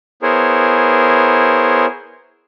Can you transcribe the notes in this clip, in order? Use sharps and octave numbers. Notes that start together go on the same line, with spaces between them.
B3 E4 G#4 A#4 C5 C#5